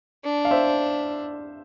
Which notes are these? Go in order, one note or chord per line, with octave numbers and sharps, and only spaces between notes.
D4
F5
C5 E5